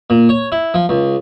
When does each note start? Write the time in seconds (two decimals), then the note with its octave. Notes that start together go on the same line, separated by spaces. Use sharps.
0.10 A#2
0.29 C#5
0.52 E4
0.74 F3
0.89 C#2